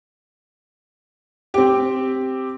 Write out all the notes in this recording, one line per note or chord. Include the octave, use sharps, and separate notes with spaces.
C4 G4